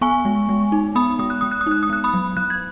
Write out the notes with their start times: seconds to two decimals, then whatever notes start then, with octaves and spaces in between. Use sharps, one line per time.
0.01 B3 G#5 C#6
0.25 G#3
0.49 G#3
0.72 D#4
0.95 B3 B5 D#6
1.19 G#3 D#6
1.30 F#6
1.41 G#3 D#6
1.51 F#6
1.61 D#6
1.67 D#4 F#6
1.83 D#6
1.89 B3 F#6
2.04 B5 D#6
2.14 F#3
2.37 F#3 F#6
2.50 G#6